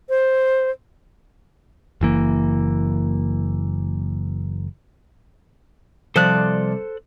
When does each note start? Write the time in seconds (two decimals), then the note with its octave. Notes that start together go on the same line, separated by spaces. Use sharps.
0.09 C5
2.01 F#1 E3 A#3
6.16 C2 F3 A4 C5 D5 F#6